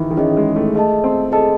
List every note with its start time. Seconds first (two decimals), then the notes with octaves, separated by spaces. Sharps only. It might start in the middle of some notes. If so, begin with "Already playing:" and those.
Already playing: D#3 E3
0.11 D#3
0.17 E3 C#4 G#4 D#5
0.37 G#3
0.56 A3
0.75 A3 G#4 D#5 A5
1.04 C4
1.32 G#4 A4 D#5 A5